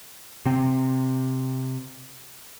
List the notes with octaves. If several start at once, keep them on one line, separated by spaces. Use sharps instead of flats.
C3 C4